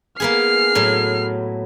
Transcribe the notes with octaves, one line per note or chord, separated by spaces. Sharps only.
A#3 B3 G#4 F6 C7
A2 F#3